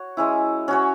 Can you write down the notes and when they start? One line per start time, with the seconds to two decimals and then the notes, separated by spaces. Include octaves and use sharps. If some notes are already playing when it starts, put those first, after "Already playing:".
Already playing: F#4 C#5
0.17 G#3 C#4 E4
0.68 C#4 F#4 C#5